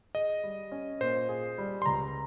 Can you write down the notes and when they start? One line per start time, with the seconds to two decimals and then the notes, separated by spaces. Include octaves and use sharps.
0.15 G#4 D#5
0.43 G3
0.72 C#4
1.01 A#2 C5
1.29 G#4
1.58 G3
1.82 C6
1.86 C#2 A#5